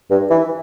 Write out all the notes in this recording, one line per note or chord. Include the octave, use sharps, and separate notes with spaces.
G2
E3